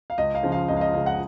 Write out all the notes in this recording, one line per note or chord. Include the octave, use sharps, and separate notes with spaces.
F5
C#2 D#5
F5
C#3 F3 G#3
F5
C#2 D#5
F5
D#5
C#3 F3 G#3 F5
F#5